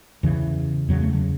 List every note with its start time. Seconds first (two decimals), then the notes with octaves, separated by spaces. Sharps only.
0.23 E2 C#3 E3
0.89 E2 C#3 F#3
1.01 A3
1.13 F#3